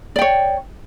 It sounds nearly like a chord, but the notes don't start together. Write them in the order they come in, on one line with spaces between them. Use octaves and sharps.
D5 G5 C#5